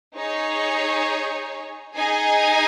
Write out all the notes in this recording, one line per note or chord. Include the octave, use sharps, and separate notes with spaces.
D#4 G#4 C#5
D#4 G#4 D#5 G#5